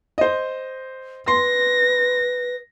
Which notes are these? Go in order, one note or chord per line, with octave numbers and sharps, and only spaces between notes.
C5 D#5
B4 C6 A#6